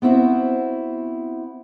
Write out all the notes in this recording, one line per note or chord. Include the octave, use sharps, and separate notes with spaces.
B3 C4 E4 F#4 C5